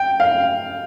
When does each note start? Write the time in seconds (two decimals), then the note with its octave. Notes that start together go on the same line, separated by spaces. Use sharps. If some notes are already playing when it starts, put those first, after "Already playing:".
Already playing: G5
0.20 F5